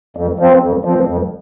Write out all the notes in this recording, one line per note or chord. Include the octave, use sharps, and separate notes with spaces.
F2
F3 C4
F2
F3 C4
F2